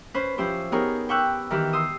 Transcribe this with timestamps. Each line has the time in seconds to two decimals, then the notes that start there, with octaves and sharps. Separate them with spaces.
0.14 C#4 B4 C5
0.38 F3 C#4 E4 G4 C5
0.72 B3 D#4 G4 G#4 A#4 C#5
1.09 G5 B5 C#6 D6 E6 F#6
1.51 D#3 E3 G4 B4
1.73 C6 D#6 E6